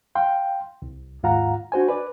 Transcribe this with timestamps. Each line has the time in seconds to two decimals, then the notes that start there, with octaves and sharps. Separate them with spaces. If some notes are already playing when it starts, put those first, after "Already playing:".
0.15 F5 G5 C6
0.82 C2
1.23 D#2 G#2 F4 F5 F#5 A#5
1.72 D4 F#4 C5 G#5
1.88 B4 D5